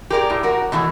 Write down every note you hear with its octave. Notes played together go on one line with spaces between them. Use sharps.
G4 G#4 A#4 C#5 D5
A2
F#3 F#4 A#4
B2 E3 F#3 A3